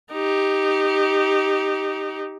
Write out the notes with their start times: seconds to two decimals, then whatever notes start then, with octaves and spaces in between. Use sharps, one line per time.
0.12 D#4 G4